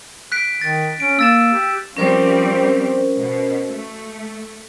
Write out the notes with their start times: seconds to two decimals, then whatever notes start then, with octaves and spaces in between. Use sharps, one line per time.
0.32 F#6 B6 D7
0.61 D#3 A6
1.00 C#4 D7
1.19 A#3 E6 A6 E7
1.54 G4
1.97 F3 G3 C4 C#4 A#4 C5
3.18 B2
3.70 A3